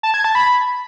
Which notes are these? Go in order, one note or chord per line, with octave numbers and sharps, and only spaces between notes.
A5
G#6
A5
B5